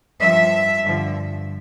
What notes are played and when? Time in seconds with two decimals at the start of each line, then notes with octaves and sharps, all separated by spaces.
0.21 G2 F3 E5
0.84 G2 D3 F3